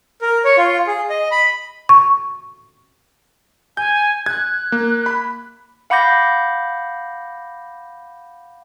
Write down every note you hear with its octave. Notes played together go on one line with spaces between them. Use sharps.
A#4
C#5
F4
G#4
D#5
B5
C#6
G#5 G6
F#6 G#6
A#3
B5
F5 F#5 B5 D6 G6 A#6